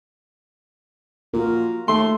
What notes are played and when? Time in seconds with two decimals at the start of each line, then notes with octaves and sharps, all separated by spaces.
1.34 A#2 F4 F#4 A#4
1.88 D#2 A3 C6